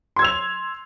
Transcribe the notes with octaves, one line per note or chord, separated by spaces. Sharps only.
C6 E6 G#6 F7